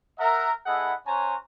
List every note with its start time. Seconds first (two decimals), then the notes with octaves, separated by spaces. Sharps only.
0.19 A#4 E5 F#5
0.66 B3 E4 G#4 A4 D#5 F#5
1.07 C#4 F#4 C5 C#5 G#5 A#5